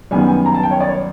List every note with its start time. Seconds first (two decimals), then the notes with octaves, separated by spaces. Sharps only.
0.11 F#2 D#3 G3 B3 G#5
0.28 G#5
0.46 A#5
0.54 A5
0.63 G5
0.71 C#5
0.80 D5
0.89 C#5